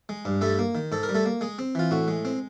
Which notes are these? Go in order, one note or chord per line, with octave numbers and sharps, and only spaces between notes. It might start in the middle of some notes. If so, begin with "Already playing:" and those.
G#3
G2
G3 A3 A4
A#3
D#3
G#2 A4
A#4
G3
A3 A4
A#3
G#3 G#4
C4
E3 F4
A2 F#4
G#3
C4